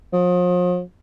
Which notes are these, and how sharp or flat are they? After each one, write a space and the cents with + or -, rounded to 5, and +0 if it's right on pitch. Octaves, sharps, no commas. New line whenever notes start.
F3 +40